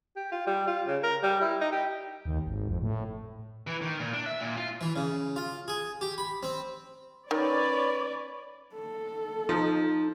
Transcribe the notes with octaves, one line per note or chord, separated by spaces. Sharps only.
G4
F4
G3
F4
C#3
A#4
G3
E4
D#4
G4
D#2
G#1
F2
A2
E3
D#3
A#2
D4
E5
A#2
F4
E3
C#3
F4
G#4
G4
B5
C4
D#3 C#4 B4 C#5 D5
A4
F3 D#4